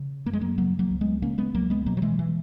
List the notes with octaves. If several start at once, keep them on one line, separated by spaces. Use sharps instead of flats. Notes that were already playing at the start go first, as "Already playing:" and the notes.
Already playing: C#3
F#2 A#3
G#3
F#3 A#3
C#3 F#3 A#3
F#3 A#3
C#2
G#3 B3
C#3 A#3 C#4
G#3 B3
C#2 F#3 A#3
G#3 B3
B2 F#3 A#3
F#3
E3 G#3
E3